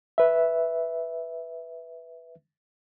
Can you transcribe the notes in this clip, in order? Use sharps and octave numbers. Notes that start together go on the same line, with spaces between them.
B4 E5